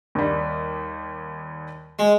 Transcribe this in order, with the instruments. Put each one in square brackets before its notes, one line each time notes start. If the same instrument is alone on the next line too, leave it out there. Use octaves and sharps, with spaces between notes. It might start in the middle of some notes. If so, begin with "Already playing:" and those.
[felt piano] D#2 G3
[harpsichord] G#3